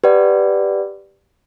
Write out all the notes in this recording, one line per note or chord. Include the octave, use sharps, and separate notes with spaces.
G4 B4 D5 F#5